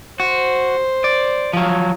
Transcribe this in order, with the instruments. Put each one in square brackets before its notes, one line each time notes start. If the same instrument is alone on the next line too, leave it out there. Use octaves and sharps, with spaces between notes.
[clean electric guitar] F#4 [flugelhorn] C5
[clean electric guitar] D5
F3 F#3